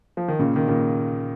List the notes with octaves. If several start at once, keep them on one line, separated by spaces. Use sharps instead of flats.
F3
D#3
A#2 C#3
D#3
A#2 C#3